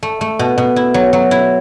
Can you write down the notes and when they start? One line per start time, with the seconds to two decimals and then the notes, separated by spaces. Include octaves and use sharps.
0.03 A3
0.21 A3
0.39 B2
0.58 B2
0.76 E4
0.94 F#3
1.13 F#3
1.31 E4